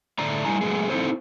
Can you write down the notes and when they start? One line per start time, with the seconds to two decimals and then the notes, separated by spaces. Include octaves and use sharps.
0.18 A2 D3 A3 D5 A#5
0.45 G3 A3 E4 G#5 A#5
0.61 F#3 G#3 A3 B3 G#4
0.90 C4 D#4 E4 A4 C5